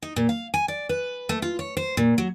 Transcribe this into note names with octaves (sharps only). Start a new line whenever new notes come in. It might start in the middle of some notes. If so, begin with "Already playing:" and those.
D#4
A#2
F5
G#5
D5
B4
A3
F4
C#5
C5
A#2
F#3